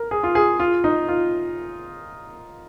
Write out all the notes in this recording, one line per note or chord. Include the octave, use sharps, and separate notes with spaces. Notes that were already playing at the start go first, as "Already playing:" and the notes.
Already playing: A#4
G#4
F4
G#4
F4
D#4
F4